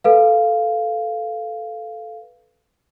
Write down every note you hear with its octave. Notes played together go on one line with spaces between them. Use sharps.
A4 B4 F5